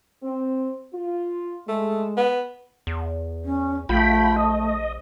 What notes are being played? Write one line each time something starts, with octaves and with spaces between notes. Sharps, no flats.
C4
F4
G#3 A3
B3
E2
C#4
A#1 A3 F4 G5 B5
D#5